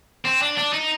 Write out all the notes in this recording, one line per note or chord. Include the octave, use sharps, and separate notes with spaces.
C4
D4
D4
D#4